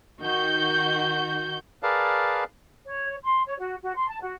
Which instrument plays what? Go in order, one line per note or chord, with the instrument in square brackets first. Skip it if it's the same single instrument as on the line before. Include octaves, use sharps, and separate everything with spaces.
[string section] D#3 F#4 G6
[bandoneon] G#4 A#4 B4 D5 F5 A5
[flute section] C#5
C6
C#5
F#4
F#4
C6
A5
F#4